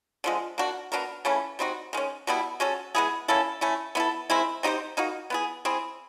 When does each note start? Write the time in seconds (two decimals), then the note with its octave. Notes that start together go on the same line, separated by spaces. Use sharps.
0.24 D3 F3 G#3
0.58 A#3 D4 F#4
0.92 B3 D4 F#4 A#4
1.25 C#3 E3 A3 C#4
1.59 G3 C4 D#4 F#4
1.93 D#3 G#3 C#4
2.27 B2 G3 B3 E4
2.60 G#3 C#4 F#4 A4
2.95 G#3 B3 E4 G#4
3.28 A#3 C#4 E4 A4
3.61 A3 C#4 E4
3.95 B3 E4 A4
4.30 D#3 G#3 C4 E4
4.63 C4 D#4 G4 C5
4.97 A#3 D#4 F#4
5.30 B3 E4 G#4
5.65 C4 E4 G#4